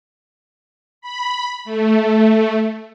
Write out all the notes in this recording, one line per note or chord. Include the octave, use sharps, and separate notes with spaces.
B5
A3